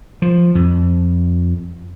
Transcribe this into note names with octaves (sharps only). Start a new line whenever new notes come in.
F3
F2